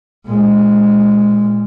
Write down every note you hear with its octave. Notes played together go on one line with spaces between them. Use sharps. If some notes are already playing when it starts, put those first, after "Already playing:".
A#2 G#3